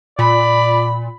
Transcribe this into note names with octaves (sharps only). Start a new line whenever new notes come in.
A#2 D5 B5